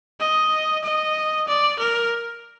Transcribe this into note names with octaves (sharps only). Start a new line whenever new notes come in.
D#5
D#5
D5
A#4